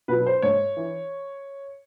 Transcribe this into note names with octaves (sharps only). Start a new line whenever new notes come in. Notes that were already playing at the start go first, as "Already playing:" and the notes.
B2 F#3 B4
C5
G#2 C#5
E3